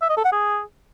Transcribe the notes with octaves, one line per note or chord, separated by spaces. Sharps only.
E5
D#5
A4
F#5
G#4